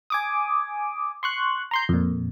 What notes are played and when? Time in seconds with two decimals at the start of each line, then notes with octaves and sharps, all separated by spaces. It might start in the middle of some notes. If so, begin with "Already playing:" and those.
0.10 G#5 D6 D#6
1.23 C6 C#6 F#6
1.71 A#5 C6 G6
1.89 F2 A#2